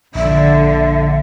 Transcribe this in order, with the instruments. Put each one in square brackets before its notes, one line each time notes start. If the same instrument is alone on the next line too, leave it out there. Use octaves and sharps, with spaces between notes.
[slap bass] A#1 [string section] D3 [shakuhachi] E5